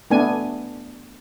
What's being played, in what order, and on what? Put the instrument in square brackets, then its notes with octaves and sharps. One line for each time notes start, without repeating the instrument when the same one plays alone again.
[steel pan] A3 B3 D4 G#5